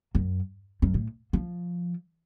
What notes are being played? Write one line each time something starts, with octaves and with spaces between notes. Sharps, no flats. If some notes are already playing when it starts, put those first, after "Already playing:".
F#2
F#2
A2
F3